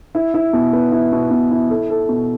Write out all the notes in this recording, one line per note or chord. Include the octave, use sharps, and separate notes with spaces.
E4
E4
B2
B3
E4
B2
B2
E4
A4
A4
B2